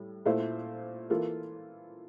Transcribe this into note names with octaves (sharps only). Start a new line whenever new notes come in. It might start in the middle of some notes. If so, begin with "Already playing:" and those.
Already playing: A2 G3
A#2 A3 E4 A4 C5
E3 A#3 F4 A4